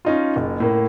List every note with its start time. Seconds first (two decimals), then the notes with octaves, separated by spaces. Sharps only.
0.05 C#4 D#4 F4
0.36 F#1
0.60 A2 A#3